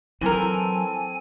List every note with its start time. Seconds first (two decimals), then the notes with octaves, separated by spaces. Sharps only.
0.21 E3 F#3 C4 A4 A#4 G#5